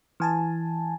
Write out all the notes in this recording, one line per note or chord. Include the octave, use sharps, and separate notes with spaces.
E3 G#5 A5